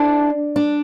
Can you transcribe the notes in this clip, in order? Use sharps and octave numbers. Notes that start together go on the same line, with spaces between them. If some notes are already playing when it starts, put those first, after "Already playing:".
Already playing: D4 E4 A4 C5 A5
D4